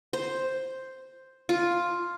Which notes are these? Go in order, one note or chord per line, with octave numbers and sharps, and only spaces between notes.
C5
F4